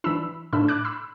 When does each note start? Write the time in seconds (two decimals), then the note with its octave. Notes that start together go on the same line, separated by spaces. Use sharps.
0.04 E3 D4 B5 E6
0.53 A2 A3 D4 B5 E6
0.68 D6 F#6
0.85 B5 E6